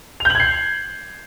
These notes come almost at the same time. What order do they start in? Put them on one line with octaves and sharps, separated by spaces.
F7 G6 F#7 G#6 C7